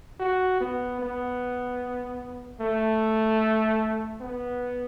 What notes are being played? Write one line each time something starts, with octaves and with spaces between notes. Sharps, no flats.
F#4
B3
B3
A3
B3